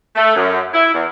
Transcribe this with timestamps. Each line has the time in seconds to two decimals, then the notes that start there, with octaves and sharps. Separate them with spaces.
0.16 A3
0.35 F#2
0.74 E4
0.93 E2